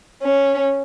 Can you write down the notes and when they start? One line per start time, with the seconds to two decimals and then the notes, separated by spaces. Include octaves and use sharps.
0.23 C#4